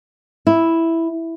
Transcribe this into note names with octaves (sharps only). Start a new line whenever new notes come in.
E4